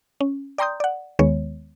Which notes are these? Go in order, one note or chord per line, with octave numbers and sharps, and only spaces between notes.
C#4
D5 G5 A#5 C6 D#6 G6
D5 F#5
D#2 D#3 G#3 B3 C#5